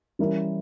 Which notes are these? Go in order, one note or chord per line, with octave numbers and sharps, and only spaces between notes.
E3 G3 C#4 E4 A#4